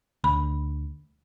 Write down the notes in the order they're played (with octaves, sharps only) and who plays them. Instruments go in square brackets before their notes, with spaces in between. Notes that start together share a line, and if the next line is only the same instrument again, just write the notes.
[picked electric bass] D2 [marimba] B5